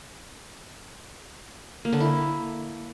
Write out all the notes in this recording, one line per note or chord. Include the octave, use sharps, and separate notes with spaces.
A#3
D3
E4